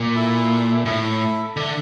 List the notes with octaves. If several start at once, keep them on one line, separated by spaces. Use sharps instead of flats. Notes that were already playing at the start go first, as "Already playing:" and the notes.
Already playing: A#2
E4 A4 E5
A2 E4 A4 E5
D3 D4 A4 E5